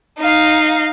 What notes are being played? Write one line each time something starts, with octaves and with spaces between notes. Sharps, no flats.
D#4 F5